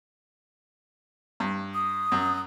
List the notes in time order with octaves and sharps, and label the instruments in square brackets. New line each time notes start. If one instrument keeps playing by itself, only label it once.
[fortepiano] G2
[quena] D#6
[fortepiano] F#2